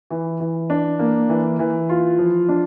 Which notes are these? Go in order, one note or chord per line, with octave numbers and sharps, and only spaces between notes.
E3
E3
D4
A#3
E3
E3
F4
F3
D4